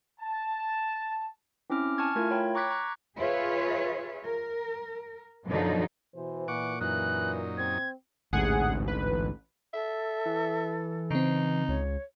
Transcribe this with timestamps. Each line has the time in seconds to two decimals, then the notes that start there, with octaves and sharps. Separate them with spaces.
0.20 A5
1.70 C4 C#4 E4 D6 F6
1.98 G#5 A5 C#6 F6 G#6
2.16 A3 E4 F4 A#4 G#6
2.31 C#5 G5 B5
2.55 A#5 C#6 D6 F#6 G#6 B6
2.70 A#5 C#6 F#6
3.18 F4 G#4 B4 C#5 E5
4.26 A#4
5.47 F#2 B2 D3 F3 F#3 D#4
6.16 B2 E3 C5
6.48 A#2 F#5 C#6 D6
6.80 F#2 E3 D#4 F#6
7.58 C4 G#6
8.33 A1 D2 G#2 C3 G#4 F#5
8.88 B4
9.74 A4 E5
10.26 E3
11.11 C#3 C4 D#4
11.68 C#2 C#5